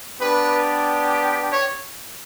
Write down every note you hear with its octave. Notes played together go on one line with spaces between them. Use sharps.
B3 D4 G4 B4
C#5